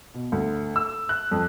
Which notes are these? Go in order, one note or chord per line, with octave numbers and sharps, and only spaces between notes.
B2
D2
E6
F#6
F2